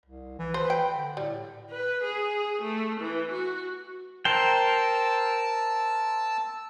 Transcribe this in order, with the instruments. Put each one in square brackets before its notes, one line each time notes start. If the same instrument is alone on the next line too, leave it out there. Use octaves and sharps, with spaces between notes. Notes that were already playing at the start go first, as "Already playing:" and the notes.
[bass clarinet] C2
E3
[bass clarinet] B4 [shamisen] C5
[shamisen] G5
[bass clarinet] D3
[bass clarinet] A2 [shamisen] G3
[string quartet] B4
G#4
A3
E3
F#4
[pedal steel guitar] A#4 C5 G5 [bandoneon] A5 E6